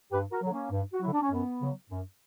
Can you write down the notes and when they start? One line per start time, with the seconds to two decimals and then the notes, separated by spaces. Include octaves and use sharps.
0.12 G2 G4 B4
0.32 F#4 A#4
0.42 D3 F#3
0.51 A#3 C#4
0.71 G2
0.93 F#4
1.01 D3 F#3 E4
1.12 D4
1.21 C#4
1.31 F#2 B3
1.60 C#3 F#3
1.90 F#2